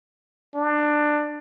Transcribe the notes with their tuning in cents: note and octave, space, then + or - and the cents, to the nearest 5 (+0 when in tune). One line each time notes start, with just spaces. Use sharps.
D4 +20